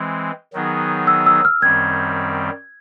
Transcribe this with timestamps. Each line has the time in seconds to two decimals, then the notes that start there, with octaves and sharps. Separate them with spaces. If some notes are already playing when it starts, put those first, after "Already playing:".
Already playing: E3 G#3 C4
0.53 D#3 F#3 B3 D#4 G#4
1.07 E6
1.26 E6
1.45 F6
1.62 F#2 D#3 G3 C4 G#6